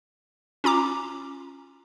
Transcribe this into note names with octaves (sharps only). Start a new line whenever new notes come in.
C#4 F4 A#5 D6